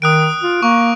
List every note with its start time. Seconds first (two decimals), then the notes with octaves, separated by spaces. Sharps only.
0.02 D#3 D#6 F#6 D7
0.42 F4
0.63 A#3 C#6